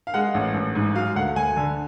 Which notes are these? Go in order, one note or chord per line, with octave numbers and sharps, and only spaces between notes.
F5
G#3 F#5
A1
A1
G#2
F#3 F5
D2 F#5
D2 G#5
D3